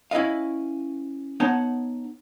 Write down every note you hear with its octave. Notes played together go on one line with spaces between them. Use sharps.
C#4 E4 B4 D#5 F5
B3 D#4 C#5 F#5 A5